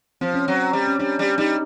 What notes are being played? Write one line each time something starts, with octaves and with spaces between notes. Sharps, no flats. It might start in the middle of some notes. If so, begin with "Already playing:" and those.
F3 C4
C#4
F#3 C4
G3
C#4
G3 D4
G3
G3 D#4